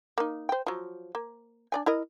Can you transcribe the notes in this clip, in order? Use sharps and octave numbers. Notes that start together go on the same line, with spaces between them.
A#3 D#4
C5 G5
F3 F#3
A#3
D4 D5 G#5
E4 A#4 D#5